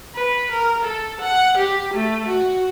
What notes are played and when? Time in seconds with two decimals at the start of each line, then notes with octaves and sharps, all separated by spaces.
0.15 B4
0.51 A#4
0.83 A4
1.21 F#5
1.57 G4
1.93 A3
2.27 F#4